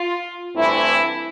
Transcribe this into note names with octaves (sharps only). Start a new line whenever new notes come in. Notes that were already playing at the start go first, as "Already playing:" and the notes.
Already playing: F4
G2 E3 A3 C4 E4